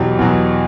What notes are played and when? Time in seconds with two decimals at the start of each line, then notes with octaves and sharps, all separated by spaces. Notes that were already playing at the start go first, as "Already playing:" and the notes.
Already playing: E2 B2 F#3 G4
0.19 E2 B2 F#3